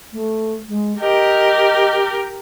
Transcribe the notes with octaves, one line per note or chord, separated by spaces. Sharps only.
A3
G#3
G4 A#4 D#5